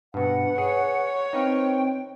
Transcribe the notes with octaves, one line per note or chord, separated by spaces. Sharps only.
G2 B2 B4 F#5
G#4 C#5
C4 D#4 B4 F5 G5